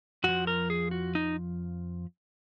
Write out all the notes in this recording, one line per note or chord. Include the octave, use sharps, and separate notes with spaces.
F2 F3 F#4
A#4
G#4
F#4
D#4